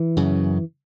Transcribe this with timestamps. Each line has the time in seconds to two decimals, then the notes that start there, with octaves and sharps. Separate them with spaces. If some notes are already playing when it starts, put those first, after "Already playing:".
Already playing: E3
0.17 F#2 C#3